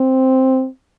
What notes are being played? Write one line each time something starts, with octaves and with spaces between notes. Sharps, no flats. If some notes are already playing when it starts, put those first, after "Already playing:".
Already playing: C4